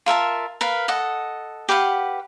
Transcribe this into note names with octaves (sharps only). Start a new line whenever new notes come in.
F4 A#4 E5 A5
A#4 B4 F5
A4 D#5 F#5
G4 B4 F5 F#5